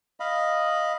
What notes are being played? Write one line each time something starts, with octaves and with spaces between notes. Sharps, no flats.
D#5 F5 B5